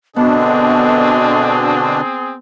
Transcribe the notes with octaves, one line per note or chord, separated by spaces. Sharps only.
B2 D3 B3 C4 D4 G#4 D#5